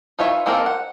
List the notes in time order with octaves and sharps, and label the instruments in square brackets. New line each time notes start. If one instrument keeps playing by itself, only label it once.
[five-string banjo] D#4 F4 B4 C#5 E5
G#3 A#3 C4 A4 A#4
F#5